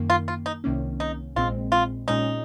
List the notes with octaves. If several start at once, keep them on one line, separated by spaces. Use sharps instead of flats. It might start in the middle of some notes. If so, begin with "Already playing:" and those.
Already playing: F#2 D#3 A#3
F4
F4
D#4
C2 C3 D#3 A#3 C#4
D#4
A#1 A#2 G#3 C4 F4
F4
A#2 G#3 C#4 D#4